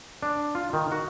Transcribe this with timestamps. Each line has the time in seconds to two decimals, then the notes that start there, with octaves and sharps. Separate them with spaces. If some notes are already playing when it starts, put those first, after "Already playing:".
0.22 D4
0.55 F4
0.73 D#3
0.92 F#4